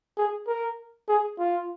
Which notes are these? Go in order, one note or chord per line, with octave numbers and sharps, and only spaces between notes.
G#4
A#4
G#4
F4